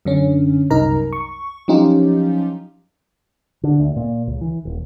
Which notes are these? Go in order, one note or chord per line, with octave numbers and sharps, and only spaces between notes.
F#2 D3 C#4
C2 F#2 D#4 A#4 A#5
C#6
F3 F#3 C#4 D#4 F4 G4
D3
D2
A#2
C#2
E3
D#1